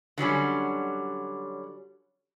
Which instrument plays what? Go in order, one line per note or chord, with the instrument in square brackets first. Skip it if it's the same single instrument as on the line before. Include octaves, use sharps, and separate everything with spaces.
[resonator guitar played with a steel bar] D3 F#3 G3 C#4